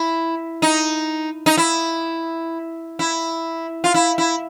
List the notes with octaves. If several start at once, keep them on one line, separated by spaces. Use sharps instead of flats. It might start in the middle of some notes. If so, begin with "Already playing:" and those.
Already playing: E4
D#4
D#4
E4
E4
F4
E4
E4